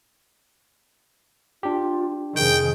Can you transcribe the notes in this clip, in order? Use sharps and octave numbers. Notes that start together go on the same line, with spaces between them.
D4 F4 G4
F2 C3 D#3 G#4 G5